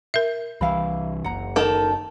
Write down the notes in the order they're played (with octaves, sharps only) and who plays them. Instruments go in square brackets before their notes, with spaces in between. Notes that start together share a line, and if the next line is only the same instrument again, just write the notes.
[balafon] A#4 E5
[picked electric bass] C2 E3 [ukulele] E4 F5 B5
[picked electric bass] F#1 [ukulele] F#5 A#5
[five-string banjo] D#3 A4